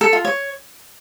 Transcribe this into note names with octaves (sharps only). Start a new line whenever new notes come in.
A4
F4
C#5